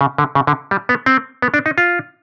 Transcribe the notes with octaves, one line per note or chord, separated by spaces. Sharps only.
C#3
D3
C#3
D3
G3
B3
C4
B3
D4
D#4
F4